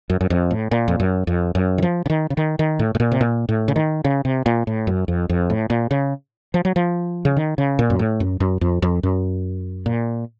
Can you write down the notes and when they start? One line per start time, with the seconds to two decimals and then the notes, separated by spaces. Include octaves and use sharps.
0.10 F#2
0.21 F#2
0.30 F2
0.51 A2
0.71 A#2
0.88 F2
1.00 F#2
1.27 F2
1.55 F#2
1.78 D#3
1.82 F3
2.06 C#3
2.10 D#3
2.30 C#3
2.37 D#3
2.59 D#3
2.79 A2
2.95 A2
3.00 A#2
3.12 C3
3.21 A#2
3.49 A2
3.68 C#3
3.76 D#3
4.05 C#3
4.25 C3
4.46 A#2
4.67 A2
4.87 F#2
5.08 F2
5.29 F2
5.50 A2
5.70 A#2
5.91 C#3
6.54 F3
6.65 F#3
6.76 F3
7.25 C#3
7.37 D#3
7.58 C#3
7.79 A#2
7.90 F#2
7.99 A2
8.20 F#2
8.40 F#2
8.61 F2
8.82 F2
9.03 F#2
9.86 A#2